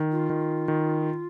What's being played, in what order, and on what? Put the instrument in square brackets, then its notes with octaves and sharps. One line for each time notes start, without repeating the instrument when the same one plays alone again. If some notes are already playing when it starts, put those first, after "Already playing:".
Already playing: [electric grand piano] D#3
[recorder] F4
[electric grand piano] D#3
D#3